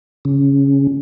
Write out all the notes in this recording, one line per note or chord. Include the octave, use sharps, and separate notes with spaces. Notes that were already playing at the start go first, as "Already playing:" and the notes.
C#3